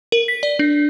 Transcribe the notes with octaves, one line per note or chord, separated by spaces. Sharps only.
A#4
B6
D5
D4